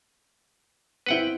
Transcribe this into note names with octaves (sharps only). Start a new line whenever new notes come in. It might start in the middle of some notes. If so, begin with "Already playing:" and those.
B3 C4 E4 B4 F#5 G5